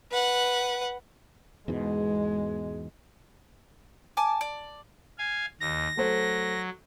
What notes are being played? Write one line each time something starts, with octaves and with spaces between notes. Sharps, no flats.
B4 F#5
E2 G#2 B2 G#3
G#5 A5 D6
D5
F5 G#5
D#2 A#6
F#3 A3 C5